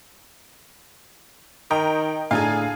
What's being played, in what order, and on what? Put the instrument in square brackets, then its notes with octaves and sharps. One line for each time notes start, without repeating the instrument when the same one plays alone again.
[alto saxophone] D#3 [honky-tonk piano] D#5 G5 A#5
[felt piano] A2 D4 A#5 [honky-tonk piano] G#4 A4 F5 [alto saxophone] G#5